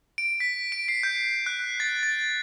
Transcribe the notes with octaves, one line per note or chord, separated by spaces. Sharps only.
D7
B6
D7
C7
G6
F#6
A6
A6